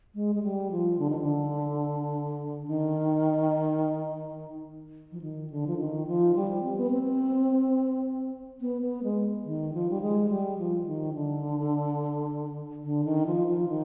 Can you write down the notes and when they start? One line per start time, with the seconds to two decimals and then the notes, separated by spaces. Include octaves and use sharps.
0.15 G#3
0.35 G#3
0.43 G3
0.71 F3
0.99 D3
1.10 D#3
1.20 D3
2.68 D#3
5.12 F3
5.22 D#3
5.50 D3
5.67 F3
5.78 D#3
6.07 F3
6.35 G3
6.63 C4
6.76 B3
6.91 C4
8.61 B3
8.82 B3
9.03 G#3
9.45 D#3
9.74 F3
9.90 G3
10.02 G#3
10.30 G3
10.58 F3
10.86 D#3
11.14 D3
12.84 D3
13.05 D#3
13.26 F3
13.47 F3
13.69 D#3